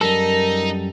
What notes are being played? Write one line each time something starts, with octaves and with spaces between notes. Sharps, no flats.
F#2 G3 D#4 A4 A#4